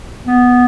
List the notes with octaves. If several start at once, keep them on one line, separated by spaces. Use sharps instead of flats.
B3